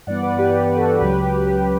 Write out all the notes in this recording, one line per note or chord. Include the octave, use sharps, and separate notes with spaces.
G2 E3 B3 D5 F#5
B4 D5
G4 B4
G4
B4
F#4 A4
C#2 C#3 F#3 G4 B4
G4
G4